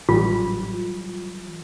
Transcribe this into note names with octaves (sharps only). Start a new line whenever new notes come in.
A1 E3 F#3 G3 F4